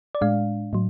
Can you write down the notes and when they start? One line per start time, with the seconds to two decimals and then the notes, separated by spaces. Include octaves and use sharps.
0.15 D5
0.21 A2 G#3 D4 F5
0.73 A2 F#3